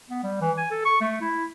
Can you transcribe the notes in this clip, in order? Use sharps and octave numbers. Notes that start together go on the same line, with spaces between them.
B3
G3
E3
G#5
A4
C#6
A3
E4